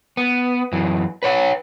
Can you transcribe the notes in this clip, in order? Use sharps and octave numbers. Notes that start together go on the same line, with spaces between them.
B3
F#2 E3
B4 C#5 F#5